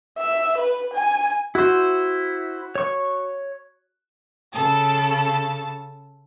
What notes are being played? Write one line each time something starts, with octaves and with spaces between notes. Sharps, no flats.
E5
B4
G#5
E4 F#4 C5
C#5 C#6
C#3 A4